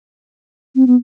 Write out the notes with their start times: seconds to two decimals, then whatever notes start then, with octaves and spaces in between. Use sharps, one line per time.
0.75 C4
0.87 B3